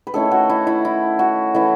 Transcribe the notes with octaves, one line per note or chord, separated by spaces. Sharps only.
B4
D#3 A3 C#4 E4 A4
F#4
E4
E4
E4
F#4
E3 A3 C#4 E4